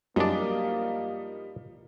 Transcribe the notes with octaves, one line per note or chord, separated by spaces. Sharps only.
F#2 F3 G3 A#3 D4 D#4